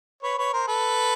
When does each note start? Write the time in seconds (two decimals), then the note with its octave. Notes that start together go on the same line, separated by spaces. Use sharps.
0.23 B4 C#5
0.38 B4 C#5
0.53 A#4 C5
0.67 A4 B4